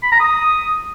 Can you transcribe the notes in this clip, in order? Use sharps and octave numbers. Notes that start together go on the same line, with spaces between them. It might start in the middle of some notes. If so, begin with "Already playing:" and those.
B5
A#5
D#6